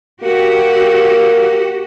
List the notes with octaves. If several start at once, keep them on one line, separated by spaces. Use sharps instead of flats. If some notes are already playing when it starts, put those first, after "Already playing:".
A#3 F#4 G4